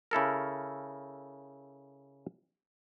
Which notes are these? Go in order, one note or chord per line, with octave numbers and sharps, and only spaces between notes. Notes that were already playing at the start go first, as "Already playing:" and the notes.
C#3 E4 A4 A#4